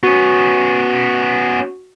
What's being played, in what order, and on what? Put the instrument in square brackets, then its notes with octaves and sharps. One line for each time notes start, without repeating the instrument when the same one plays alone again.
[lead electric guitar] B3 C#4 [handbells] F#4